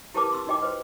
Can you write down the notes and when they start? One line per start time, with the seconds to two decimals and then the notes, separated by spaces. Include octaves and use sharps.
0.14 E4 G4 A#4 B4 A5 D6
0.32 C6 E6
0.47 D#4 F#4 D#5 G5 D6
0.62 B4 C5